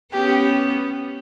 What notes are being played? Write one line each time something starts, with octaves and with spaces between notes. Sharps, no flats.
B3 C#4 G4